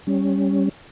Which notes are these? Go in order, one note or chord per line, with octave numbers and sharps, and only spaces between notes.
G3 C#4